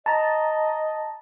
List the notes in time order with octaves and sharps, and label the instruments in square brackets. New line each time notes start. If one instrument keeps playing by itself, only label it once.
[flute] D#5 [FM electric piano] A5 A#5